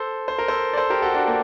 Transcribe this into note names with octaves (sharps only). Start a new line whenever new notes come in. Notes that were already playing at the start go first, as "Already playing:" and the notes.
Already playing: A4 C5
C5
A#4
A4 C5
D5
A4 C5
G4 A#4
F#4 A4
G4
D4 F#4
A#3